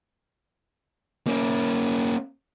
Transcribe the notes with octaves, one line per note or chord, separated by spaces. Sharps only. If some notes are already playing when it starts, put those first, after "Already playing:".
A#3 C#4